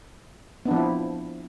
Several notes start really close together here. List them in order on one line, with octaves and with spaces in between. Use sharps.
B3 D4 F3 C4 E4